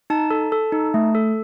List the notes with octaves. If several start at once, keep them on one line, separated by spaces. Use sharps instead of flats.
D#4 A5
A4
A4
D#4
A3
A4